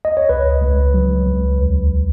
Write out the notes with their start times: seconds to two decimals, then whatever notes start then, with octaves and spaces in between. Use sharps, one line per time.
0.05 D#5
0.17 C#5
0.29 C#2 B4
0.62 C#2
0.94 F#3
1.26 C#2
1.59 D#2